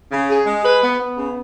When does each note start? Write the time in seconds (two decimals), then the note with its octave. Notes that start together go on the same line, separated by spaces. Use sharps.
0.11 C#3
0.30 G#4
0.46 G#3
0.64 B4
0.83 B3
1.00 B3
1.17 C#3